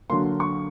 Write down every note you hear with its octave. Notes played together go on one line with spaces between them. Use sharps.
D3 F#3 A#3 C6
C#6